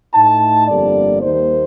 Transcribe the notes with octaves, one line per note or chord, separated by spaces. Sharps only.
A2 A3 D#4 A5
G1 F2 D3 G3 A#3 D5
D#2 D#3 G3 A#3 D#4 C5